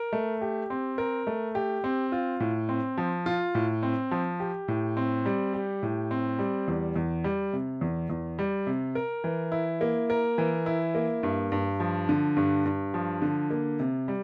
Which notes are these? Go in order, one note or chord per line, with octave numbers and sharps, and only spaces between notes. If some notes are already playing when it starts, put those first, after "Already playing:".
Already playing: A#4
A3
G4
C4
A#4
A3
G4
C4
F4
A2
C4
F3
F4
A2
C4
F3
G4
A2
C4
G3
G4
A2
C4
G3
E2
E2
G3
C3
E2
E2
G3
C3
A#4
E3
E4
A#3
A#4
E3
E4
A#3
G2
G2
F3
D3
G2
G2
F3
D3
A#3
C3
G3